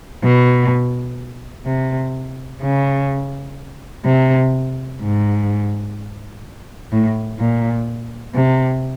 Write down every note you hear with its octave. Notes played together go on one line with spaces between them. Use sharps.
B2
C3
C#3
C3
G#2
A2
A#2
C3